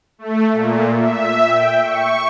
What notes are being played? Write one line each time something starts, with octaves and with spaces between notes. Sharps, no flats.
A3
A#2
E5
G5
C#6